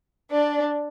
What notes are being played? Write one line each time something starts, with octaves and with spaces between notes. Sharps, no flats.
D4 D5